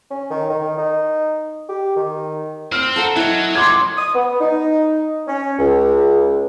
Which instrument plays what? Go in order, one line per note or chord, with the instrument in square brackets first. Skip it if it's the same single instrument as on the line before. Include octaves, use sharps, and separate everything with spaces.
[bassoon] C#4
D#3
D#3
D#4
G4
D#3
[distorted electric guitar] C4 [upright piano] F6
[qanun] A4 A#4 F#5
[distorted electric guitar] F#3 [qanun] E4 D#5
[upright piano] C6 D6 G#6
[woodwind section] D#6
B3
D#4
C#4
C#2